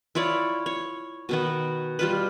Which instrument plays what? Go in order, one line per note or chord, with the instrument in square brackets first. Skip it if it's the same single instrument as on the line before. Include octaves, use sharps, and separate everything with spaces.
[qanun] E4 F4 C#5 D5
C#5
B2 D#3 B3
G3 F4 B4